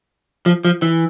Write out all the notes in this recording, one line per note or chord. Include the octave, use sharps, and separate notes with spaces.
F3
F3
E3